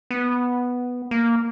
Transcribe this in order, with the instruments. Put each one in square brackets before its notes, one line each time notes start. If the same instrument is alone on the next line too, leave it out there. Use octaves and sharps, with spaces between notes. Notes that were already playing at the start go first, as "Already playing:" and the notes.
[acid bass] B3
A#3